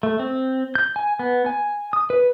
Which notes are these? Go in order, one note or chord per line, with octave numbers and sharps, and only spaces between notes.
A3
C4
G6
G#5
B3
G#5
D#6
B4